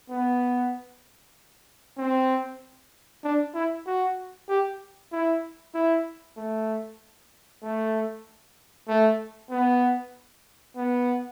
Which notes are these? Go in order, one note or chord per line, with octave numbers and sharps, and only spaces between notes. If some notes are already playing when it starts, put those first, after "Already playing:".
B3
C4
D4
E4
F#4
G4
E4
E4
A3
A3
A3
B3
B3